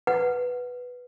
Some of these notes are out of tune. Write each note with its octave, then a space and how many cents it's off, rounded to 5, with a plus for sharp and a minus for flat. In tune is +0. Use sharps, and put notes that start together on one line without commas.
B4 +0 F#5 +0